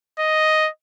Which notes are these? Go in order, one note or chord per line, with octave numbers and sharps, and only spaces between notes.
D#5